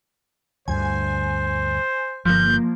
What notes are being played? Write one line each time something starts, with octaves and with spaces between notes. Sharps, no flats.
D2 G2 D3 C5 G#5
G1 F3 A#3 G6